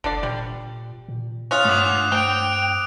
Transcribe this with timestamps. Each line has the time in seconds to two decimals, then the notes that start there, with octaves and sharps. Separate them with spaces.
0.04 F#1 D3 D4 D5
0.23 A#2 G3
1.09 A#2
1.51 C#4 F4 D#6 F#6 F7
1.65 G2 A3 F#5 D6 D#6
2.12 C4 G5 F#6 D7